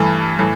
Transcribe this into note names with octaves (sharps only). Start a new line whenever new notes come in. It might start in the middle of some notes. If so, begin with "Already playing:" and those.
Already playing: G2 E3 A3
A2 E3